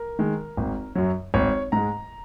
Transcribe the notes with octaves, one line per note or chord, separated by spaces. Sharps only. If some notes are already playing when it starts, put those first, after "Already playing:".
Already playing: A#4
D#3 G#3
G#1
F#2 F#3
G#1 C#5
G#2 G#3 A#5